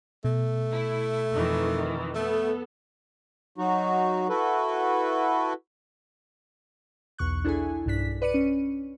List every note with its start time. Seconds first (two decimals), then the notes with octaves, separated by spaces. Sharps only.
0.24 B2 A3
0.72 E4
1.31 F2 D#3 E3
2.15 A3 B3 A4
3.58 F#3 D#4 F#4
4.29 E4 F#4 A4 B4
7.18 B1 E2 C#6 F#6
7.44 D4 E4 G#4 A4 G#5
7.86 B1 G2 D4 B6
8.22 B4 D5 C#7 D#7
8.34 C#4